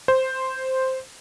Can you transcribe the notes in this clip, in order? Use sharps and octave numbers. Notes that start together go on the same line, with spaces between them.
C5